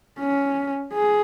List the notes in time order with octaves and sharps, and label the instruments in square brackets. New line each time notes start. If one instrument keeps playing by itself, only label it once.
[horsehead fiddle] C#4
G#4